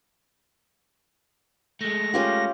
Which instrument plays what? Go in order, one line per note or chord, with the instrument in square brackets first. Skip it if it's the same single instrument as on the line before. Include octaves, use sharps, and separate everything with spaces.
[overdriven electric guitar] G#3 A3 [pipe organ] A#6
[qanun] C#4 F4 G4